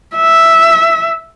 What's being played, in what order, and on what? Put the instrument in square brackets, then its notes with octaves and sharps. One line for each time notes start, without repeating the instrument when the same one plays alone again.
[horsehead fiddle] E5